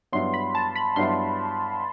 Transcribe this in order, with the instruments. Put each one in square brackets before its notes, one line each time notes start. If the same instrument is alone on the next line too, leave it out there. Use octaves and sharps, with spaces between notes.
[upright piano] G2 F#3 B3 E4 [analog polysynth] C6
[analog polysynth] B5
A5
B5
[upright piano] G2 F#3 B3 E4 [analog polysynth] C6